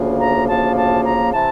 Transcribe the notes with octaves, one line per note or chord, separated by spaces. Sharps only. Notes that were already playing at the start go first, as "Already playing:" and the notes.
Already playing: D2 C#3 F3 A#3
A#5
D2 C#3 F3 A#3 A5
A5
A#5
C3 E3 A5